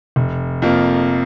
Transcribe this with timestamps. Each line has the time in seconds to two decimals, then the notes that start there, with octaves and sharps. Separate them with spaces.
0.16 F1
0.62 F2 F3 A#3